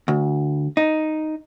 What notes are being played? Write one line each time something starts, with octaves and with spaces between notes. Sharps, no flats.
D2
D#4